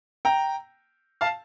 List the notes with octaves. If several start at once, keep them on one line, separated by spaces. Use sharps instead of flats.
G5 A#5
F5 A5